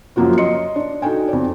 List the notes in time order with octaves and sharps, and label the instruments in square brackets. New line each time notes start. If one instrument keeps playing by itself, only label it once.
[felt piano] F#2 F3 F#3 A#3 F4 F#4
D#5 C6 C#7
D4
D#4 F#4 A4 G5 G#5
F2 D5